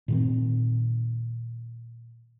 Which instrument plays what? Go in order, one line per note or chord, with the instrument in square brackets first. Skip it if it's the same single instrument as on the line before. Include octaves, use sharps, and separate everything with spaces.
[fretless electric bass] A#2 D#3 C4